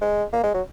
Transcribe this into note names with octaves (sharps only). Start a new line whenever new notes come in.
G#3
A#3
G#3
F#3